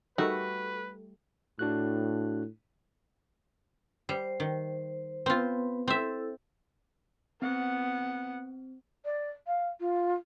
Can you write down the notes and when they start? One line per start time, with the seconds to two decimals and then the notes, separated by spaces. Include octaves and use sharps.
0.18 G3 A3 D#4 F#4 A#4 B4
1.59 A2 D4 F#4 F#6
4.09 G3 C5
4.40 D#3
5.26 B3 C4 F4 B4
5.88 C4 E4 A4 E5
7.42 B3 C4 F#5
9.05 D5
9.47 F5
9.80 F4